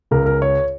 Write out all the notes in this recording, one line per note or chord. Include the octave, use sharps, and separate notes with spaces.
C#2 C#3 A#4
A#4
C#5